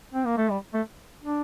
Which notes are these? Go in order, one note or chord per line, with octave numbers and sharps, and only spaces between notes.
C4
A#3
A3
G3
A3
D4